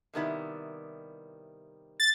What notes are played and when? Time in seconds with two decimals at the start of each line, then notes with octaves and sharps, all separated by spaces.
0.13 C3 D#3 G3 B3 E4
2.00 A6